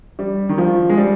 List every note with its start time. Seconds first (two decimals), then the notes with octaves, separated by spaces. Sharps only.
0.19 G3
0.49 D#3
0.58 F3
0.90 G#3
0.97 G3